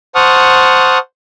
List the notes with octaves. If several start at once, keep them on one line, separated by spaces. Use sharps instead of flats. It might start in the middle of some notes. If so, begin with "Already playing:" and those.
C5 F#5 A5 C#6 D#6 F6